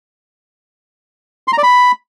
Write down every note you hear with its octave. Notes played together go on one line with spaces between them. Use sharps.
C6
A#5
D5
B5